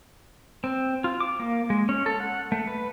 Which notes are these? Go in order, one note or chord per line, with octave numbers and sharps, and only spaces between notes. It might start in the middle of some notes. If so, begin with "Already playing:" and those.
C4
F4
D6
A#3
G#3
C#4
A4
F#5
A3
B4